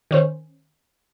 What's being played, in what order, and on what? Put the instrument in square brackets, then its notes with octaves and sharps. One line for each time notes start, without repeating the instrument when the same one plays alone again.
[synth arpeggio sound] D#3 C#4 C5